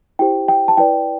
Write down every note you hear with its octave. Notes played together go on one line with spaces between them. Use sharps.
E4 G4 C5 G5
G5
A5
E4 B4 D5 G5